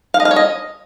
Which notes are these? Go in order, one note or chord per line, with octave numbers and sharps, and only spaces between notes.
F5
D#5
F5
C#5
D#5